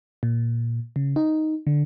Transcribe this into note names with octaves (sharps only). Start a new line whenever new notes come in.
A#2
C#3
D#4
D3